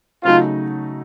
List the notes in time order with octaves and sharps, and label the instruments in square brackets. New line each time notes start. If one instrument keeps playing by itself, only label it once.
[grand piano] C#3 F#3 A3 D#4 [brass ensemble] F4